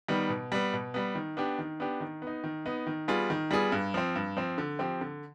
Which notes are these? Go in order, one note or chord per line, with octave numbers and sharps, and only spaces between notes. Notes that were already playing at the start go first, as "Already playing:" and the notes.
D#3 G3 B3
B2
G3 B3
B2
G3 B3
D#3
B3 D4 G4
D#3
B3 D4 G4
D#3
B3 D#4
D#3
B3 D#4
D#3
G3 B3 F4 G#4
D#3
G3 B3 F4 G#4
G2
F3 C4
G2
F3 C4
D3
F3 C4 G4
D3